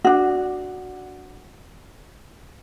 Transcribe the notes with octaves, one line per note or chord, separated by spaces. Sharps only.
D4 F#4